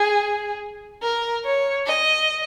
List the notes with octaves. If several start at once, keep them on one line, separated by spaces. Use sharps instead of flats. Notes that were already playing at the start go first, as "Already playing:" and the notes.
Already playing: G#4
A#4
C#5
D#5